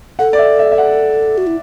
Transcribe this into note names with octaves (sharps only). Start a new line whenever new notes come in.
A4 F#5
D5
E5
E5
E5
F#5
F#4
E4